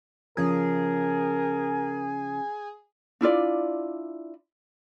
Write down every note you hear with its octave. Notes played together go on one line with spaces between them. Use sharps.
C#3 F3 C#4 G#4 A#4
D4 E4 F4 D5